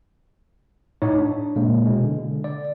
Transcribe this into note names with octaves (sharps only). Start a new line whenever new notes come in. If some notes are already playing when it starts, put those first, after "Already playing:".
A2 D#4 C#5
D4
A#2 G#3 A#3
B2 G#3
D3
D5